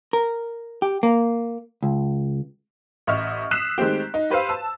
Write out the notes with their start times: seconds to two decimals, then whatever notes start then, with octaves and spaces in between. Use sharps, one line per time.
0.13 A#4
0.82 G4
1.03 A#3
1.83 C#2
3.07 A1 D#5 E5 C#6 F6
3.51 D#6 E6 F#6 B6 C7 E7
3.78 D#3 G#3 A3 C4 G4
4.14 D#4
4.30 G4 B4 C5 F5 E6
4.49 A5 E6